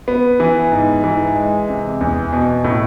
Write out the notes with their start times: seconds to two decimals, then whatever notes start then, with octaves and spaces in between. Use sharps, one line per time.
0.08 B3
0.40 E3
0.72 G#2
1.04 E3
1.36 G#3
1.69 C3
2.01 E2
2.33 B2
2.64 A2